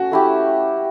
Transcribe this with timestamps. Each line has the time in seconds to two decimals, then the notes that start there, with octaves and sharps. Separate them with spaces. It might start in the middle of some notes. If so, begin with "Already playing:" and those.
Already playing: C#4 F#4 A4
0.12 A3 E4 G4